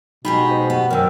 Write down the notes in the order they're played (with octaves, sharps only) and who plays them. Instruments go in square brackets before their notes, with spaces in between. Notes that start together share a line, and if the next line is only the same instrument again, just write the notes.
[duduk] B2 [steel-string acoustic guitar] G#3 G4 G#4 [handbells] D#4 B5
[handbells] C5
[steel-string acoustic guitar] B3
[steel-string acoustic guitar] F#2 D#3 [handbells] A#4 G5 E6